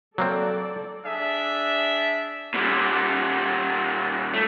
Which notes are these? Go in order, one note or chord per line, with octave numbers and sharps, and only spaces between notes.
F#3 A#3 C4 A4 D5
D4 G#4 E5
A#2 G3
A3